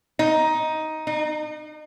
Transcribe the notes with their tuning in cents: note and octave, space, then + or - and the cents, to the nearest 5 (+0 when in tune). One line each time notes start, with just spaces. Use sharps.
D#4 +10
D#4 -40